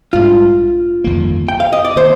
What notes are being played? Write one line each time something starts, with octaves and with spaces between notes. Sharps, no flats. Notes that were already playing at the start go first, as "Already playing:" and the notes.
A#1 G#2 G3 D4 F4
G1 F2 D#3 A#3
G5
F5
D#5
D5
D#3 A#3 C5